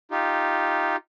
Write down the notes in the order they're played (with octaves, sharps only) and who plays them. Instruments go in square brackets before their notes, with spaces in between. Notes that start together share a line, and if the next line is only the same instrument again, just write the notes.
[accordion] D#4 F4 G4